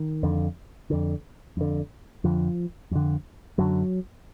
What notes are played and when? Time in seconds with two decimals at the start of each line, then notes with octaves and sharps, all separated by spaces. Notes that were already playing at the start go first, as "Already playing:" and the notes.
Already playing: D#3
0.23 F2 D3
0.90 F2 D3
1.57 F2 D3
2.24 F2 D3 F3
2.91 F2 D3
3.58 F#2 D3 F#3